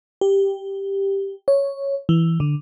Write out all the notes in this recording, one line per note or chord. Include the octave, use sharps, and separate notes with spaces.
G4
C#5
E3
D3